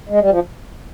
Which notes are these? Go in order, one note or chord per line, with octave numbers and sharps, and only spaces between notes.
G#3
G3
F3